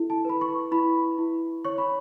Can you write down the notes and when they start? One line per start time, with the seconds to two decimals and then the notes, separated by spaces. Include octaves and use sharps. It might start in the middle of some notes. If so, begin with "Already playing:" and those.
Already playing: E4 A4
0.10 A5
0.25 B4 B5
0.41 C#6
0.72 E4 B5
1.18 E4
1.65 C#5 C#6
1.78 B5